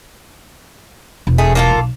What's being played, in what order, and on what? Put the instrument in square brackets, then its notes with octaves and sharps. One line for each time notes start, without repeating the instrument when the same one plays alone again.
[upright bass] E1
[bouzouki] A3 G#4
A#3 F4 A4
[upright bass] B1